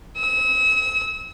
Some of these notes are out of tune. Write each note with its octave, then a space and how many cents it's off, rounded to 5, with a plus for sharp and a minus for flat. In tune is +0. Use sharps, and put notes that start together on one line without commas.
E6 -40